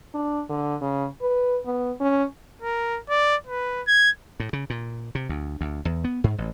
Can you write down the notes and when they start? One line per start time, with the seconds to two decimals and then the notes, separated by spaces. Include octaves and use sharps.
0.14 D4
0.49 D3
0.81 C#3
1.22 B4
1.66 B3
2.00 C#4
2.62 A#4
3.10 D5
3.47 B4
3.87 G#6
4.40 A2
4.53 C#3
4.70 A#2
5.15 C3
5.29 D2
5.61 D2
5.85 E2
6.04 B3
6.24 G#2
6.38 A1